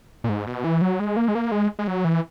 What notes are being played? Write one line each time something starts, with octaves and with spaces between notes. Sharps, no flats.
A#2
G#2
B2
E3
F#3
G#3
A#3
G#3
A#3
G#3
G#3
F#3
E3